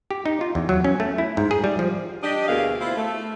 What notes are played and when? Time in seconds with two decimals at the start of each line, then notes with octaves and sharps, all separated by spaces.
0.11 G4
0.26 D#4
0.41 F4
0.55 E2
0.69 F#3
0.84 C#4
1.00 A3
1.18 E4
1.37 G#2
1.51 G#4
1.64 G3
1.79 F3
2.23 D4 G4 D#5
2.47 D2 B2 E3 A#3 G#4 F5
2.80 E4 F4 C5
2.97 A3